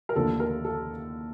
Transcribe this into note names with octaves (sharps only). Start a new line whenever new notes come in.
A#4
D#2 D3 F3 A3 A4
A#4
A4